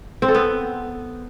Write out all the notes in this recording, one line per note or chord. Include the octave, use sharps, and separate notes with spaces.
C4
A4
B3